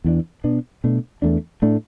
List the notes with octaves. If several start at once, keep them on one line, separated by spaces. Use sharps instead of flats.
E2 E3 A3 D4
B2 B3 D4
B2 A3 D4
E2 E3 A3 D4
A2 A3 D4